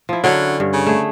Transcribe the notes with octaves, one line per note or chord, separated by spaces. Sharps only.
F3 E4
D3 F#3 C#4
G2
C#3
A3 G#4